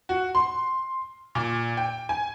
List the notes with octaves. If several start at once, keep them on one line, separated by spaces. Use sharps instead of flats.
F#4
C6
A#2
G5
G#5